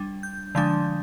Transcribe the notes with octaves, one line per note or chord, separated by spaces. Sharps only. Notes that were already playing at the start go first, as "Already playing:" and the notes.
Already playing: G3 D4
G6
D3 F3 G#3 D4 G6